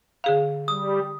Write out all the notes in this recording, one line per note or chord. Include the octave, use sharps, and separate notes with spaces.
D3 G#4 F5
G3 D#6